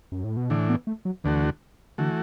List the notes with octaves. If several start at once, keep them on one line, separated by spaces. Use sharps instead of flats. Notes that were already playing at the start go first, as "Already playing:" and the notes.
F#2
A2
B2
A2 D3 E3 D4
B3
A3
F#3
D2 D3 E3 A3 F#4
D3 E3 A3 F#4